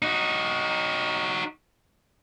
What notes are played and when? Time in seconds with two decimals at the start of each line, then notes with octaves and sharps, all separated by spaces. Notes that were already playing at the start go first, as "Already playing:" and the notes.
0.02 D#4 F#4